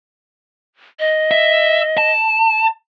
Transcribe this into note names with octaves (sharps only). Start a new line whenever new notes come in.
D#5
E5
A5